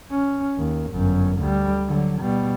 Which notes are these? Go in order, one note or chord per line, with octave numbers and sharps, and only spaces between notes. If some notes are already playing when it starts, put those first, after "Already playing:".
C#4
D#2
G1 F#2
D2 G3
D3 F#3
B2 G3